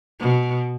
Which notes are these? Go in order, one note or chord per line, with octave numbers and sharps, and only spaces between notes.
B2